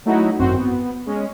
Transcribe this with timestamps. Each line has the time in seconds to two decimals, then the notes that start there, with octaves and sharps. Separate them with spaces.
0.05 F#3 A3 D#4 E4 F#4
0.39 G#1 F#2 C4 F#4 C5
0.58 B3
1.06 G#3 C#4